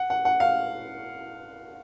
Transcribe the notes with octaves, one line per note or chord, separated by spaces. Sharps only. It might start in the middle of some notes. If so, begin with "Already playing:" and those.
Already playing: F#5
F#5
F#5
F5